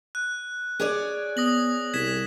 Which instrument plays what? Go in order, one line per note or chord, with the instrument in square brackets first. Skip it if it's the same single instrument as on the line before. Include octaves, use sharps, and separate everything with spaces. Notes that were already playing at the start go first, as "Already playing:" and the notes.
[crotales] F#6
[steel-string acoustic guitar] G#4 C#5 D5
[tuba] B3 [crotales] D#6 A#6 F#7
[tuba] C2 [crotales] G#6 B6 E7